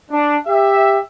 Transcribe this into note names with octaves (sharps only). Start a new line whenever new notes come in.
D4
G4 E5